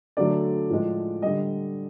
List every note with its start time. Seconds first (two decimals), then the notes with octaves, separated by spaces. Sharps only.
0.17 D3 F#3 A3 D5
0.70 A2 F3 G#3
1.22 D3 G3 D#5